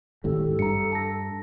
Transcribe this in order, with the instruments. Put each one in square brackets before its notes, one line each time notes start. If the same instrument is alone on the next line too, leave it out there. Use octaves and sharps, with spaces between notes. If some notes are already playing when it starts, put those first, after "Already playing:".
[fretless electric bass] D#1 G#1 A2 [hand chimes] G4 [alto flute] A4
[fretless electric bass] G2 [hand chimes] A#5 C#7
[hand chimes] A5 A#6